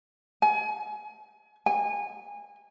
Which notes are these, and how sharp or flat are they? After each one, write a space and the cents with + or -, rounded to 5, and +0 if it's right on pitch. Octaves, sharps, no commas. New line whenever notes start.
G#5 +30
G#5 -25